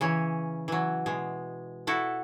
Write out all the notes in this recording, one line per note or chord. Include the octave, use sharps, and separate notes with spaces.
C#3 E3 C#4
E3 F#3
B2 G#3
E4 F#4 A4